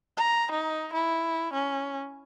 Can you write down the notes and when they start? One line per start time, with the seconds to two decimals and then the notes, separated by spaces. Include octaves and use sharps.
0.17 A#5
0.51 D#4
0.93 E4
1.53 C#4